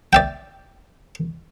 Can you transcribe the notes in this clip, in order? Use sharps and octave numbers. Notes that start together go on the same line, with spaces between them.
D5 E5 G5